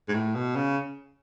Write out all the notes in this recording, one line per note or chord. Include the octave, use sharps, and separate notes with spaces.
G#2
A2
B2
C#3